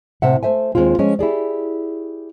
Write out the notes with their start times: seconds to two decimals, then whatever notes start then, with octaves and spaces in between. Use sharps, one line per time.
0.22 A2 C3 E5 F#5
0.43 A3 C5 E5 G#5
0.75 D#2 D3 G#3 C4 F4
0.98 F3 G#3 C#4
1.19 E4 G4 G#4 D5